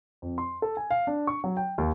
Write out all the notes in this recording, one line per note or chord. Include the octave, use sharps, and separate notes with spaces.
F2
C6
A4
G#5
F5
D4
C#6
F#3
G5
D#2